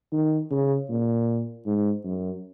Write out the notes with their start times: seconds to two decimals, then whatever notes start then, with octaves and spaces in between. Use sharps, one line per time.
0.12 D#3
0.51 C#3
0.89 A#2
1.65 G#2
2.04 F#2